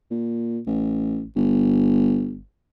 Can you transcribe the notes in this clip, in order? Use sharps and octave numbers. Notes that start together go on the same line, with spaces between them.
A#2
A1
G1